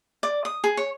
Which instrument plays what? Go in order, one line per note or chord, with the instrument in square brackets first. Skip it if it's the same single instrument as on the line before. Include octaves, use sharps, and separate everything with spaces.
[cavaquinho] D5
D#6
G#4
C#5